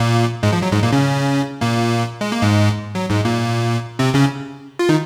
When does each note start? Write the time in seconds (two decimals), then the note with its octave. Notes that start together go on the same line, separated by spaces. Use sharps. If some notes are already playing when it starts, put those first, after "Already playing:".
Already playing: A#2 A#3
0.43 G#2 G#3
0.53 F3
0.62 F#3
0.73 G#2 G#3
0.83 A#2 A#3
0.93 C#3 C#4
1.61 A#2 A#3
2.21 G#3
2.32 A#3
2.42 G#2 G#3
2.95 F#3
3.10 G#2 G#3
3.25 A#2 A#3
3.99 C3 C4
4.14 C#3 C#4
4.79 F4
4.89 D#3 D#4